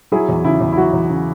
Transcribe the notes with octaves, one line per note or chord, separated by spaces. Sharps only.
F#3 E4 G#4
E2
C#3 E4
E2
E4
F#3 F#4
E2
C#3